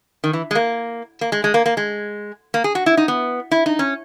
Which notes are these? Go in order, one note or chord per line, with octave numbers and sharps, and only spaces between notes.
D#3
E3
G#3
A#3
A#3
G#3
G#3
A#3
A#3
G#3
A#3
G#4
F#4
E4
D#4
B3
E4
D#4
C#4